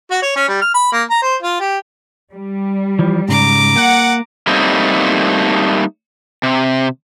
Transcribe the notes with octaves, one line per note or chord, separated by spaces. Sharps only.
F#4
C#5
C#4
G3
F6
B5
A#3
A#5
C5
F4
G4
G3
E3 F3
G#2 C#3 A#5 D6
A#3 F#5
G3 A3 A#3 C4 D#4
C3